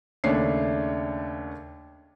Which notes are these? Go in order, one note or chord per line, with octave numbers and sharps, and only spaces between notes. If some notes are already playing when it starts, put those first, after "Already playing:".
D#2 C#3 A3 D4 C#5 C7